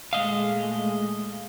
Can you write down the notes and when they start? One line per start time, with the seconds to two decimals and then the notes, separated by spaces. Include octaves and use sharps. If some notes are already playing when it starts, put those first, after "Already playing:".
0.13 A#2 G#3 A3 D#5 F5